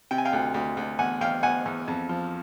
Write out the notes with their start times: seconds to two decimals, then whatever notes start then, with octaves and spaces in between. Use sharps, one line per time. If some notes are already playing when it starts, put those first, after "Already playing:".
0.11 C3 G5
0.18 G#5
0.25 F5 G5
0.33 D2
0.54 D2
0.77 D2
0.99 E2 F#5 G#5
1.21 E2 F5 G5
1.43 E2 F#5 G#5
1.65 E2
1.88 F2
2.09 F3